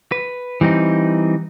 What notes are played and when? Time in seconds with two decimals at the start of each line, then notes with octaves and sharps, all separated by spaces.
0.12 B4
0.61 E3 G3 C4 D#4